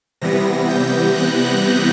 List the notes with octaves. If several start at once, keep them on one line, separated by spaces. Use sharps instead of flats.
C3 E3 G3 B3 A#6
G6
F#6
F#6